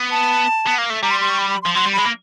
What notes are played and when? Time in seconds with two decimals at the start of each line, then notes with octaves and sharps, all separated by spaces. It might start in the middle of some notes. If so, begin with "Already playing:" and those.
Already playing: B3
0.11 A5
0.67 B3
0.78 A#3
0.90 A3
1.03 G3 A#5
1.11 C6
1.21 C6
1.30 C#6
1.39 B5
1.50 B5
1.62 C6
1.66 F3
1.75 F#3 C6
1.86 G3
1.93 B5
1.99 G#3
2.06 A#3